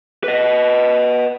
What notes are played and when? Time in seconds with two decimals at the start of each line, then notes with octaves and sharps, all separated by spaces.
0.24 B4 D#5